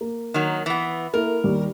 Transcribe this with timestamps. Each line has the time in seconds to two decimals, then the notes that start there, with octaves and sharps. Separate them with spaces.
0.01 A#3
0.34 D#3 F#3
0.66 E3 B3
1.14 A#3 E4 A4 A#4
1.44 D#2 G3